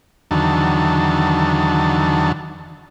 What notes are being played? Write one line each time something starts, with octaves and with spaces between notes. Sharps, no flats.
E2 D3 D#3 F#3 A5